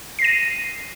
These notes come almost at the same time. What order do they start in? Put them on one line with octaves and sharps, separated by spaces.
C7 A#6 D#7